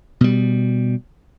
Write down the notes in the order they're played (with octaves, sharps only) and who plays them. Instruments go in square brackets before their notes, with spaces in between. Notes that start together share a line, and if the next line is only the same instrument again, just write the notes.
[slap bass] B2 G3